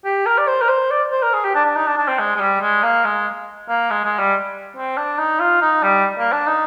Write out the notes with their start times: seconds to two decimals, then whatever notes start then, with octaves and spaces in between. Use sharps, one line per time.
0.04 G4
0.26 A#4
0.38 D5
0.47 C5
0.61 A#4
0.69 C5
0.90 D5
1.12 C5
1.23 A#4
1.34 G#4
1.44 G4
1.55 D4
1.65 D4
1.75 D#4
1.87 D4
1.97 D4
2.08 C4
2.19 G#3
2.36 G#3
2.40 G3
2.61 G#3
2.83 A#3
3.04 G#3
3.69 A#3
3.90 G#3
4.04 G#3
4.19 G3
4.76 C4
4.97 D4
5.18 D#4
5.40 F4
5.61 D#4
5.83 G3
6.18 A#3
6.32 D4
6.47 D#4